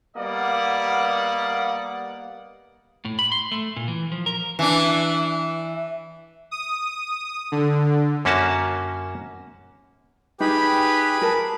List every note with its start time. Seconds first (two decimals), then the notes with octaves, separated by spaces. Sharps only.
0.17 G3 A#3 B3 D5 D#5 F#5
3.05 A2
3.19 B5
3.32 C6
3.52 A3
3.76 A#2
3.88 E3
4.12 F3
4.26 A#4
4.59 E3 D4
6.51 D#6
7.52 D3
8.25 F#2 A#3 C#4 F#4 A5
10.40 D#4 G4 G#4 B4 B5
11.22 A#4 A5